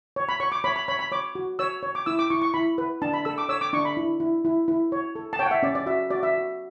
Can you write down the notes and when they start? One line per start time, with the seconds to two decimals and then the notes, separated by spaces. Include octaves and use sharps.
0.16 C#5
0.29 B5
0.40 C#5 C#6
0.52 D6
0.64 C#5 B5
0.76 B5
0.88 C#5 B5
0.99 B5
1.12 C#5 D6
1.35 F#4
1.59 C#5 E6
1.83 C#5
1.95 D6
2.06 E4 E6
2.19 D6
2.30 E4 C#6
2.42 C#6
2.54 E4 B5
2.78 B4
3.02 D4 A5
3.14 B5
3.25 A4 E6
3.38 D6
3.49 C#5 E6
3.61 D6
3.73 D4 C#6
3.85 B5
3.97 E4
4.20 E4
4.45 E4
4.68 E4
4.92 C#5
5.16 A4
5.33 A5
5.39 C#5 G5
5.46 F#5
5.51 E5
5.63 C#4 D5
5.75 D5
5.86 F#4 E5
6.10 F#4 D5
6.23 E5
6.34 F#4